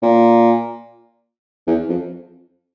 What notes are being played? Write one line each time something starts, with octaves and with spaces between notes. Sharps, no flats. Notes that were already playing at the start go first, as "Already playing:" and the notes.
A#2
E2
F2